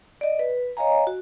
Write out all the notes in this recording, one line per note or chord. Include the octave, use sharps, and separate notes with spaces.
D5 D#5
B4
C#5 D#5 F5 G#5 A#5
F#4